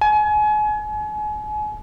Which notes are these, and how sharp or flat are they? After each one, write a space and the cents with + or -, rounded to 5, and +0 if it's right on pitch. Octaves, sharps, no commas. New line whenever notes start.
G#5 +35